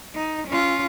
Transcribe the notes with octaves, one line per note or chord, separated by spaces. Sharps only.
D#4
C#4 F4